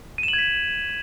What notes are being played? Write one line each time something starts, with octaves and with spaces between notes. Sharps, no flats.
D#7
E7
F#7
G#6
B6